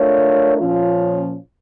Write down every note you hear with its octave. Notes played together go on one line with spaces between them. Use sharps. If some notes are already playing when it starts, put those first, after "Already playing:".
Already playing: A3 D4 F4 A#4 C#5
A#2 F3 C#4 F4